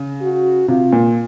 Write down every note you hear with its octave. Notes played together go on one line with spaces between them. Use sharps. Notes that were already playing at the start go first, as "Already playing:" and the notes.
Already playing: C#3
F#4
C3 F4
A#2